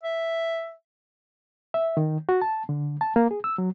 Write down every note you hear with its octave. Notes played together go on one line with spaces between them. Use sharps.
E5
E5
D#3
F#4
A5
D3
A5
A#3
G#4
E6
F#3